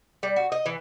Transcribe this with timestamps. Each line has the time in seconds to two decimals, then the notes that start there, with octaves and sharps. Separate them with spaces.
0.23 G3
0.36 F#4
0.52 D#5
0.66 E3